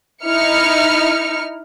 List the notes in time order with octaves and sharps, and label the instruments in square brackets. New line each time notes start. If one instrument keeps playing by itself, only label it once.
[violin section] D#4 E4 F6 C#7